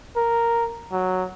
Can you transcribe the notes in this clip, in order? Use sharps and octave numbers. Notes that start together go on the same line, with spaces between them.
A#4
F#3